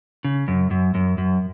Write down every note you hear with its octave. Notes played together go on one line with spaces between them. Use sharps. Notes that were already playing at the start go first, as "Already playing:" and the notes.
C#3
F#2
F#2
F#2
F#2